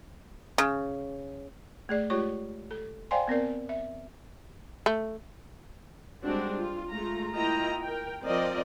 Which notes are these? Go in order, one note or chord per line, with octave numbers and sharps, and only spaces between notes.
C#3
A3 G#4 D5
G#3 A3 F4 G4 C#5 C#6
A4
C5 D5 F5 G5 G#5 C6
B3 C4 A#4 D5
E5
A3
G3 G#3 C4 D4 F#4
F4
G#3 A3 F4 A#5
A#3 E4 F4 D#5 G5 A#5
A#4 G5
F3 C4 A#4 D5 D#5